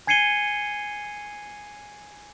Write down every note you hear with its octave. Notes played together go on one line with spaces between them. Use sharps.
G#5 G#6 C7 C#7 D#7 G7